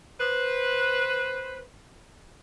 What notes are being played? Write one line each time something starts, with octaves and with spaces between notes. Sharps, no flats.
B4 C5